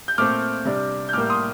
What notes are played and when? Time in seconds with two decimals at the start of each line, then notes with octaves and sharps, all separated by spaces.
0.08 G6
0.18 A#2 A3 C4 D6 F6
0.65 C3 G3 D4
1.09 G6
1.13 A2 G3 A#3 D6 F6
1.29 C6 D#6